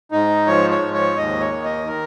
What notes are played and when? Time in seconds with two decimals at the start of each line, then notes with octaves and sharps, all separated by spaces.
0.11 G#2 D#4
0.47 F3 C#5
0.70 C#5
0.82 G#2
0.94 C#5
1.17 D#2 D#5
1.41 C#5
1.52 D#3
1.64 D#5
1.87 D#3 A#4